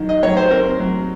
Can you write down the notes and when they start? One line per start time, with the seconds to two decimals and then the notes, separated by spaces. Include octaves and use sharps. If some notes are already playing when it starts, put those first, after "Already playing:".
Already playing: D#3 F#3
0.09 D#5
0.23 F#3 C#5
0.37 C5
0.51 C4 A#4
0.80 F#3